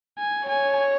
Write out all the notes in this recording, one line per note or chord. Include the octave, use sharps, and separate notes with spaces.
G#5
C#5 G#5